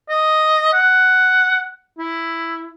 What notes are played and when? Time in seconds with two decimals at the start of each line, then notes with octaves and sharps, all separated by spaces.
0.10 D#5
0.73 F#5
1.99 E4